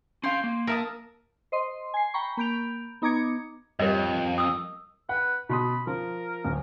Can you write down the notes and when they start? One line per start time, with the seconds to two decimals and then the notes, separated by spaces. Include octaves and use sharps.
0.23 C#4 F5 G5 C6
0.44 A#3
0.67 A#4 E5 A5 D#6
1.52 C5 D#5 C6
1.94 G#5 C7
2.14 G5 A#5 B5 C#6
2.37 A#3 B5 G6 D7 F7
3.02 B3 D#4 A#5 D6 G#6 C#7
3.80 F2 G3 G4 A#4 C#5 D#5
4.38 D#6 E6
5.09 B4 F#5
5.49 B2 B5 C6 D#6
5.87 F3 A#4
6.45 D1